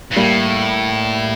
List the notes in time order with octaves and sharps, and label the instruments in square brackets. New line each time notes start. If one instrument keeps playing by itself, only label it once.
[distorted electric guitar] G2
[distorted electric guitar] A2 [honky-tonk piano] G3 A#3